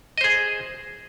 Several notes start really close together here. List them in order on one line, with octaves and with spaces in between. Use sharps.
D#5 C5 G#4